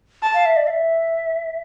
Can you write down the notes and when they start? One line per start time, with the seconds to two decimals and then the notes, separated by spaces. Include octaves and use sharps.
0.22 A5
0.34 F5
0.46 E5
0.57 D5
0.67 F5
0.70 E5